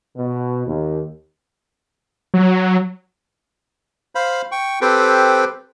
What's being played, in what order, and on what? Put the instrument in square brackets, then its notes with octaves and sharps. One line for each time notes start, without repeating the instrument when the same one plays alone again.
[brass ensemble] B2
D#2
[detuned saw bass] F#3
[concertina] C5 F5 B5
G5 C#6
C4 G4 A4 B4 C5 G5